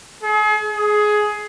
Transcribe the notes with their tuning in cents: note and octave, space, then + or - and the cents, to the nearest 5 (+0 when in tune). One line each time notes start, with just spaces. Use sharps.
G#4 +40
G#4 +15